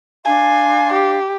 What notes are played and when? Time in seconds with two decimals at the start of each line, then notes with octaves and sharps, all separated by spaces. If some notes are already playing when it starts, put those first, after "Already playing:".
0.25 D4 F5 G#5 C6
0.93 G4